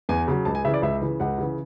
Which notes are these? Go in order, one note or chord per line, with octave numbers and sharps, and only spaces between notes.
E2 G#5
C#3 F#3
C#2 A5
G#5
C#3 E3 E5
D5
C#2 E5
C#3 E3
C#2 F#5
C#3 E3